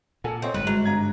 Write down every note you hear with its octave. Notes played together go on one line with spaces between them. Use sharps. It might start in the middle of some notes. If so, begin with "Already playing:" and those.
A#2 A4 F#5 G#5
C4 C#5 D#5 C6
G1 G#2 G3 B4
F#3 G#3
G2 A#5 G#6